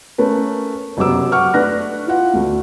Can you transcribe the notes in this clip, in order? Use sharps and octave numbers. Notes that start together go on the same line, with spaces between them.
A3 C#4 A#4 B4
F#1 F#2 C3 B3 D6 E6
F#5 C#6 D6 F6
A3 D4 B4 F#6 A#6
E4 F4 F#5
D2 A3